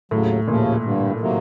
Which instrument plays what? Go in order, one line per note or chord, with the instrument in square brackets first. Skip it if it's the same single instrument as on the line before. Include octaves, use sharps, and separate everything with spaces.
[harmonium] D#2 C#3 F#3 [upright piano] A2
[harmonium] D#2 C#3 F3 A3 C#4 [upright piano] A#2
[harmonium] G2 D3 G3
C3 D#3 F#3 A#3